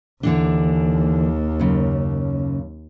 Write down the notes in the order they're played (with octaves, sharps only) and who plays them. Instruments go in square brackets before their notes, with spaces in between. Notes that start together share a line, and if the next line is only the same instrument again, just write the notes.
[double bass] D#2 [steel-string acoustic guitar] D3 E3 D4
[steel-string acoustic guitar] F#2 C#3